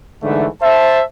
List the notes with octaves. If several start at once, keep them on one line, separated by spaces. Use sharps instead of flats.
G#2 D3 E3 A3
C5 E5 A5